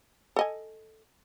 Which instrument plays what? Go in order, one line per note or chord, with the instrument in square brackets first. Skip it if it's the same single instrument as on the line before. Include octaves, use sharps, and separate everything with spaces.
[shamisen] A4 D#5 G#5